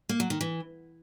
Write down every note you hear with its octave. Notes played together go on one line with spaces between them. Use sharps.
A#3
F#3
D#3
E3